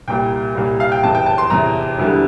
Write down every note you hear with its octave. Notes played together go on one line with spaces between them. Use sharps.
C2 A#2 G3 G5
C2 A#2 G3
F5
G5
F1 E2 C3 A5
G5
A5
C6
F1 E2 C3 A#5
E1 E2 D3 G3